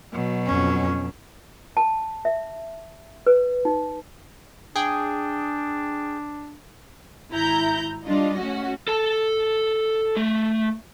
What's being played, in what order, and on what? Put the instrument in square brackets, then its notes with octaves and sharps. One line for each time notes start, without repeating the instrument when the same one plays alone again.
[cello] B2 F#3
[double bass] F2 C#4
[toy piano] A5
E5
B4
D#4
[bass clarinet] D4 [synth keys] G#4 G5
[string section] G#1 E4 A#5 G6
G3 D4 F4 D#5
A3 C#4 F#4
[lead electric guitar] A4 A5
A3